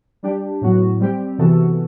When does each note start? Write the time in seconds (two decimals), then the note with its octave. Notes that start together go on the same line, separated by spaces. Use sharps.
0.23 G3 D4 G4
0.61 A2 F#3 B3 F#4
1.00 G3 C4 G4
1.38 C3 E3 B3 F#4 A4